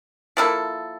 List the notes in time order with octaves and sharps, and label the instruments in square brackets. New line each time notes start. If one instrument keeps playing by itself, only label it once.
[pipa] F3 A#3 E4 A4